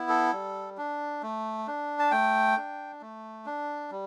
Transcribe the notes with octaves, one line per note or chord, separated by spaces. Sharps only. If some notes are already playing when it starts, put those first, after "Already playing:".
Already playing: B3 E4
A4
G3
D4
A3
D4
A5
A3 G5
D4
A3
D4
G3